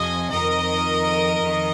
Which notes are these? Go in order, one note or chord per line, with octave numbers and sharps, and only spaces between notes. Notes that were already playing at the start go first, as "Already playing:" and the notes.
Already playing: F2 C3 F3 D#5 G#5
F2 D#3 A#4 D#5
F2 D#3